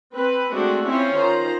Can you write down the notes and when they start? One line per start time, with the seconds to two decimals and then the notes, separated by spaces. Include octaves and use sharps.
0.13 C4 B4
0.52 G#3 A3 C4 D4 F#4
0.87 C4 C#4 E4 F4 C5
1.15 D#3 F4 C5 A#5